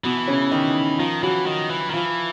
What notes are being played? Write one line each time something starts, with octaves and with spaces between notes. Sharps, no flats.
B2 E3 B3
C#3 C#4
D#3 D#4
D#3 F3 F4
E3 F#3 F#4
D#3
E3
D#3
E3 F3 F4